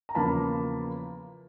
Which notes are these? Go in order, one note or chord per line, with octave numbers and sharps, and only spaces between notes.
A#5
E2 C#3 F3 A#3 A5 B5